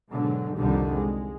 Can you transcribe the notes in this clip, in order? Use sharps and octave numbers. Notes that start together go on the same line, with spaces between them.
G#2 B2 D3 F#3
C2 F2 D3 D#3 G3
G#3